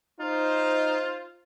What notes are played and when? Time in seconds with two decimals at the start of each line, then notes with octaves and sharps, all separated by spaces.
0.20 D#4 F4 C5